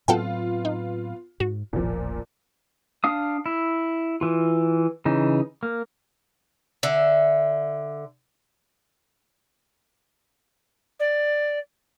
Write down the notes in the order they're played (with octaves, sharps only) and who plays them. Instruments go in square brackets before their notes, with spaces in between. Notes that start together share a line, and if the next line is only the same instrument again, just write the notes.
[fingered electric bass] A2 F#3 C4 [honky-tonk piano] B3 F4 [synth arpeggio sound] A4 F#5 G5
[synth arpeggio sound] D#4
[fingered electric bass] G#2 [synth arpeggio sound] F#4
[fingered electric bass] D#1 A1 [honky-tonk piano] A#2 F3
[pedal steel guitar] D4 F5 D#6
E4
E3 F4
C#3 E3 D#4
A#3
[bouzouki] D3 E5
[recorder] D5